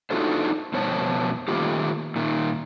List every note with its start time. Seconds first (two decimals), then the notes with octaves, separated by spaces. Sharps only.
0.10 D4 D#4 F4 F#4 A4 C5
0.73 F2 B2 C5 C#5 A5
1.48 D#3 A3 A#3 F4 G4
2.16 A#2 D#3